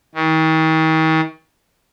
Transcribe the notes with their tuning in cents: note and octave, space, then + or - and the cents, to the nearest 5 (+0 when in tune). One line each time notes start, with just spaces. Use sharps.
D#3 +40